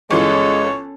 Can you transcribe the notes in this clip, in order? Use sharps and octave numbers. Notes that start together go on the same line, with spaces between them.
G1 E3 G#3 C#4 F4 A4 C#5